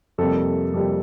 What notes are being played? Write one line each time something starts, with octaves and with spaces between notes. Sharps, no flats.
F2 C3 G3 A#3 A4
F2 C3 G3 A#3